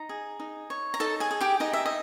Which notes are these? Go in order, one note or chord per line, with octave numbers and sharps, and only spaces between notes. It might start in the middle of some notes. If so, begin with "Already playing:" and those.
Already playing: D#4 A#5
G#4
D#4
C#5
A#5
D#4 A4 A5
G#4 G#5
G#4
G4 G5
D#4 D#5
E5
D#5